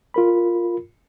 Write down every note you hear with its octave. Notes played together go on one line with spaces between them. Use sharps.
F4 A#4 B5